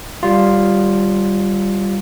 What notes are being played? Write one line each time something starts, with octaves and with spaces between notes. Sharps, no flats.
G3 F4